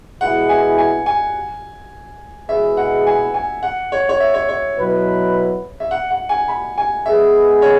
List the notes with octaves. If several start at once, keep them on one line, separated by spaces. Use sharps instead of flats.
B2 G#3 E4 G#4 B4 F#5
G#5
G#5
G#5
B2 G#3 E4 G#4 B4 E5
F#5
G#5
G#5
F#5
C#5
C#5
E5
C#5
C#5
B2 F#3 E4 B4
E5
F#5
F#5
G#5
B5
G#5
G#3 B3 G#4 B4 E5
C#5